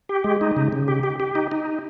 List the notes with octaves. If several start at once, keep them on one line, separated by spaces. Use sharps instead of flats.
G4
G#3
D#4
C#3
C#3
G4
G4
G4
D#4
D#4